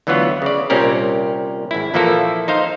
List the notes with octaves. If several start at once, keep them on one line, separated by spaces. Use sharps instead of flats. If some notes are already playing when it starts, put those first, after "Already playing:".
D2 E3 F#3 B3 F4 F#5
C#3 D5
C2 A#2 C4 C#4 G4 A#4
G#1 E4
A#2 E3 F3 A#3 E4 A4
D#4 C5 F5